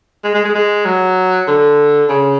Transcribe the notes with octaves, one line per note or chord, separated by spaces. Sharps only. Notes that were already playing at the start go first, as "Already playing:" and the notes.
G#3
G#3
G#3
G#3
F#3
D3
C#3